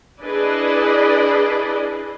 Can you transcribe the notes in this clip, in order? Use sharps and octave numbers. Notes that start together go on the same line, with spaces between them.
D4 E4 G#4 B4 D5 D#5